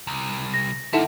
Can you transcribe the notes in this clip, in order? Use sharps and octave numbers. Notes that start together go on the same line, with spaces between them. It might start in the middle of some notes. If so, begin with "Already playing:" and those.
C2
A#6
D3 A#3 D#4 E4 A4 E5 F#5 A5